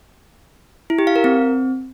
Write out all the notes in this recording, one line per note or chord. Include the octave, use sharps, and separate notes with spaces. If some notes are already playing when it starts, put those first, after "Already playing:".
E4
G4
F5
A#4
C4